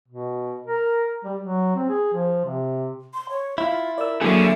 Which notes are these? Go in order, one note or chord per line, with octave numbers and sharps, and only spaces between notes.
B2
A#4
G3
F#3
C4
G#4
F3
C3
C6
C#5
E4 F4
A#4 D5 E6
D3 F#3 A#3 C#4 E4 G#4 A4 E5